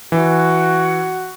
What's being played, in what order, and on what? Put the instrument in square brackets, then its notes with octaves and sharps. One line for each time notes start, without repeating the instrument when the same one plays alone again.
[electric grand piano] E3 [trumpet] F#4